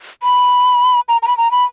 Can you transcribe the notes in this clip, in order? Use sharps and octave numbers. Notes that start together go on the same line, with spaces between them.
B5
A#5
A#5
B5
A#5
B5